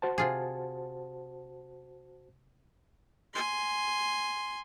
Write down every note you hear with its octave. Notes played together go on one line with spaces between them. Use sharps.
F#4 C5 A5
C3 F4 G#4
G#5 C6